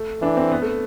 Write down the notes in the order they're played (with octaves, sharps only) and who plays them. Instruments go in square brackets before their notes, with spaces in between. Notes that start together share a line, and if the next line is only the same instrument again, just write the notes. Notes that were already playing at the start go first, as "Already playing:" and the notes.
Already playing: [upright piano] A3
[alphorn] E3 [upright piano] D4
[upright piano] C4
B3
A3